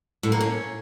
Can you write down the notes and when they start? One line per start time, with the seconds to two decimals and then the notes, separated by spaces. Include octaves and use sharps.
0.23 A2
0.32 A#3
0.41 C#4